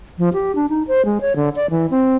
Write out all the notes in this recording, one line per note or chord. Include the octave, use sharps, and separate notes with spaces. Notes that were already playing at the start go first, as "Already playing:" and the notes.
F3
G4
D4
D#4
C5
G#3
C#5
D3
D5
E3
C4